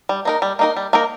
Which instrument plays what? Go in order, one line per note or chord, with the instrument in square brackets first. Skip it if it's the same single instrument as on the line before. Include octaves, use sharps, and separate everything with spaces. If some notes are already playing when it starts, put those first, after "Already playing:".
[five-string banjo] G3
A#3 D#4 A#4
G3
A#3 D#4 A#4
G3
A#3 D#4 A#4